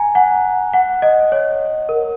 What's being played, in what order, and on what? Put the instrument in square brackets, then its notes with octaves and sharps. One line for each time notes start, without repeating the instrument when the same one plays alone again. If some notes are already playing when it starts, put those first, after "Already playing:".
Already playing: [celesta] G#5 A#5
F#5
F#5
D#5
C#5
A#4